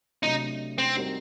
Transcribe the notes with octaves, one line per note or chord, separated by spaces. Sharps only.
C3 F#3 A3 D4 D#4
C4
G3 C4 D#4 F#4 A#4